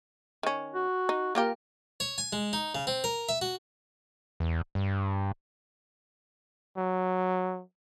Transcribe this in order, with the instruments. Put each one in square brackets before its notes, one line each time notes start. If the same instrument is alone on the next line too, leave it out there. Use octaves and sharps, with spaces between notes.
[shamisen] D#3 C#4
[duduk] F#4
[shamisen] D#4
[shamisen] A#3 F4 G4 [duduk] A#4
[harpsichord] C#5
G#5
G#3
D#4
C#3
C4
A#4
E5
F#4
[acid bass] E2
G2
[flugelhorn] F#3